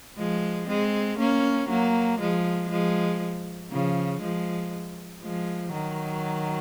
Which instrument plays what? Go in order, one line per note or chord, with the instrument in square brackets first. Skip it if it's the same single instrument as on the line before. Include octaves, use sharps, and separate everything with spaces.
[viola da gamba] F3 G#3
G#3 C4
A#3 C#4
F#3 A#3
F3 G#3
F3 G#3
C#3 F3
F3 G#3
F3 G#3
D#3 F#3